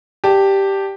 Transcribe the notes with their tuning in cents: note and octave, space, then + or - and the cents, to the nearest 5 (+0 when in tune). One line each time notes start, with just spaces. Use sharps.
G4 +0 D5 +0 A5 +0